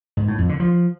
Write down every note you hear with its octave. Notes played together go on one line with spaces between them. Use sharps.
G#2
A2
F2
D3
F3